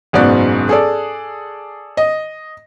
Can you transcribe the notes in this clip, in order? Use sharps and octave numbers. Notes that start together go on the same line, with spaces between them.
F#1 G#2 B2 D5 F#6
G#4 A4 D5
D#5